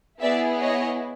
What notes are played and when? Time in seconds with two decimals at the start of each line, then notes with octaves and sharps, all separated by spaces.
0.21 B3 E4 G#4 D5 E5
0.62 C#5 D#5